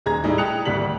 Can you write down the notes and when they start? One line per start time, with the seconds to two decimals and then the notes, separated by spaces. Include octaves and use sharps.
0.06 D#1 G#4 A#5 G#6
0.24 A2 G3 D#4
0.38 G5 A5 D#6 F#6 C#7 F7
0.65 G#1 D2 G3 B6 F#7